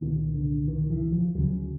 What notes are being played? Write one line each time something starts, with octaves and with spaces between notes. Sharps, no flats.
C2 A#2 D#3
D3
D#3
E3
F3
D2 C#3 F#3